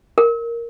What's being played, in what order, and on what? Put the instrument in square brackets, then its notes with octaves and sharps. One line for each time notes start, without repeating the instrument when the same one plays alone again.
[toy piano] A#4